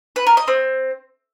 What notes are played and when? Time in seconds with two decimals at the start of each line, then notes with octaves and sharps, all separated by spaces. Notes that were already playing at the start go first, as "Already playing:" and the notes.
0.16 B4
0.27 A#4
0.37 D#5
0.48 C4